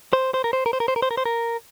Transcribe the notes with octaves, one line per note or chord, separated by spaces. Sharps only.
C5
C5
A#4
C5
A#4
C5
A#4
C5
A#4
C5
A#4
C5
A#4